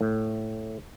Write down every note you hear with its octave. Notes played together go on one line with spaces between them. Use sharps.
A2